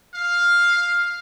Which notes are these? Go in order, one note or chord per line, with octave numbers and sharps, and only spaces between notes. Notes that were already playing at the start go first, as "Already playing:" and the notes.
F5